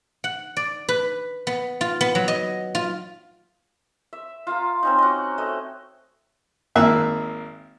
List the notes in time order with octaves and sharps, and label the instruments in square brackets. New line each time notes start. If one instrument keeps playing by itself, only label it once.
[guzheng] F#5
D5
B4
B3
F4
B3
F#3
D#5
F4
[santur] E5
F4 F5 A#5
C4 C#4 D#4
F#4 D#5
A3 D#5
[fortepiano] G#1 A#3 E5 F#6